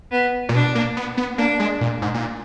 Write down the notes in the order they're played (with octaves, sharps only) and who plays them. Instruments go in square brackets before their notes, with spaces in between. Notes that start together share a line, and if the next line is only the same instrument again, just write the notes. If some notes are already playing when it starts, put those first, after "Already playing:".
[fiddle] B3
[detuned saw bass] A#2
[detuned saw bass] B2 [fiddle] D4
[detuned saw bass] A#3
B3
B3
[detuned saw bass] A#3 [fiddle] D4
[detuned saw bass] G#3
A#2
G#2
A#2